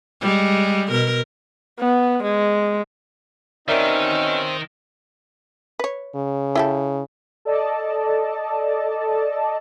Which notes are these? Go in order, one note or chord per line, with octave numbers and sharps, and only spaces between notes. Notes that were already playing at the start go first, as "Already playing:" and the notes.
G3 G#3
B2 A#4
B3
G#3
B2 D#3 C4 C#4 D#4 A#4 D5 E5
B4 C#5
C#3
E4 G4 A4
A4 D5 D#5 A5